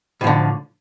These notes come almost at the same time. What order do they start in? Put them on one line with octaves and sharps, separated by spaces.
A2 F3 D3